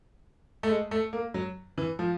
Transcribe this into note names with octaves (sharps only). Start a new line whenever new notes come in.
A3
G#3
A3
A#3
F#3
E3
F3